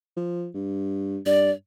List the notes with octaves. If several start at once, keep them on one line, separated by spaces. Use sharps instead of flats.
F3
G2
G2 D5